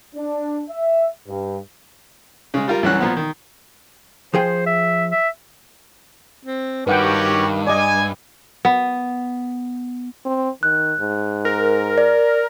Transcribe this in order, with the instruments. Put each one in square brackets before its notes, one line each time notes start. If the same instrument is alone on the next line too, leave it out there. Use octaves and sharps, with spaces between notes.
[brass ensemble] D4
E5
G2
[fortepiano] C#3 G#3
G3 F4 A#4
C2 E3 F#3 C#4 F#4 F#6
A#2 F3 B3
D#3
[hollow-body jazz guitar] F3 G#4 G5 [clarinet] C5
[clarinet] E5
E5
[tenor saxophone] C4
[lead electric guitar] G2 [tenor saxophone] D#3 [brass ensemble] C#4 F#4 G4 [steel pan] B4 F#5 G5
[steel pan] D5 D#5 [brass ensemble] G#5
[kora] B3
[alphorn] C4
[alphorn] D#3 [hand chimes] F#6
[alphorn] G#2
[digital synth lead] A#4
[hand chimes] D5